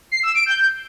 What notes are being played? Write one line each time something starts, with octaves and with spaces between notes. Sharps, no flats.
C7
E6
D7
G6